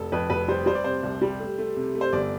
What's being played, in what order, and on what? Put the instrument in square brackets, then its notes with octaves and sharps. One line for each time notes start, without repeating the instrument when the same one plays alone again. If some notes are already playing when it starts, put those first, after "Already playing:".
Already playing: [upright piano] F1 A4
F2 B4
F1 B4
G3 C5
G3 C5
D5
C3 C5
C2
G3
A3
A3
C3
A3
C5
G1 D5